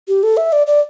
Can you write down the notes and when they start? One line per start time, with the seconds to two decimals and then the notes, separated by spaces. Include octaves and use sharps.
0.08 G4
0.23 A4
0.37 E5
0.53 D5
0.67 D5